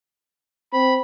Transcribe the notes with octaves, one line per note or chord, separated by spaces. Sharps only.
C4 B5